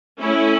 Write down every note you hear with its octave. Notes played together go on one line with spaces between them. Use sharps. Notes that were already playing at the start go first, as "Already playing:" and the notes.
A3 C#4 E4